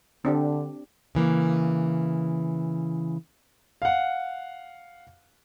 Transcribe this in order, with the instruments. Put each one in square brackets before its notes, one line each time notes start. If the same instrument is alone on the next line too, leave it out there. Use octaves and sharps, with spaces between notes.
[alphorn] D3 [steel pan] C4 D4 G4
[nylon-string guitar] C#3 E3 A#3
[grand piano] F5 F#5